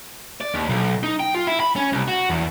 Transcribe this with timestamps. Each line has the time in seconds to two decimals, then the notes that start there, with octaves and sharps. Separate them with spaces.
0.41 D5
0.54 D#2
0.69 B1
1.03 D#4
1.20 G5
1.35 F4
1.47 E4
1.60 B5
1.76 C#4
1.92 C2
2.08 F#4
2.30 E2